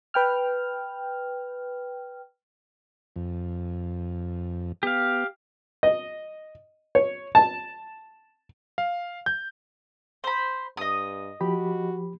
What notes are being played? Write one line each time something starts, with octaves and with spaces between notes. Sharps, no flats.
B4 G5 F6
F2
B3 G4 F5
D#5
C#5
A5
F5
G6
C5 B5
G2 D#5 D#6
F3 F#4 G4 B5